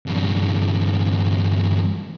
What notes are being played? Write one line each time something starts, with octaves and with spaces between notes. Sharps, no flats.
E2 G2